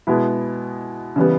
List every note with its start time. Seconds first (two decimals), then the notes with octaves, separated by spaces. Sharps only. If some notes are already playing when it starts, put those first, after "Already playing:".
0.07 B2 G#3 B3 E4
1.16 C#3 E3 G3 B3